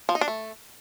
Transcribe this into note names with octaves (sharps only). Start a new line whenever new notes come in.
F3
D#4
D4
A3